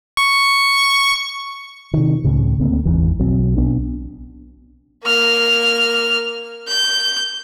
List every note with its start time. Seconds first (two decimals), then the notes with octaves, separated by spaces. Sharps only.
0.17 C#6
1.93 C3 D#3
2.24 C#2 A2 C#3
2.60 D2 A#3 C4
2.85 G#1 E2 G#2 E3
3.19 B1 F#3 C4
3.57 B1 B3 D4
5.04 A#3 F6
6.68 G6